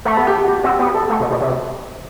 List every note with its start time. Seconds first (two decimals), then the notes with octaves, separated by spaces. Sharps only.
0.05 A3
0.17 B3 A4
0.27 G4
0.37 G4
0.44 F#4
0.48 G4
0.63 C4 F#4
0.79 B3 G4
0.94 A4
1.10 A3
1.20 B2
1.30 B2
1.40 C3